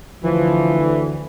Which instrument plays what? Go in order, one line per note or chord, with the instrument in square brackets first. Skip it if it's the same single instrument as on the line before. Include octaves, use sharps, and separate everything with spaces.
[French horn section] D2 D3 [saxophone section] E3 [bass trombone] F3